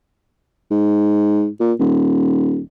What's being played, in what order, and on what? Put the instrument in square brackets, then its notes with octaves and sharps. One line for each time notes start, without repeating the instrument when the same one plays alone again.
[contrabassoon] G#2
A#2
D#1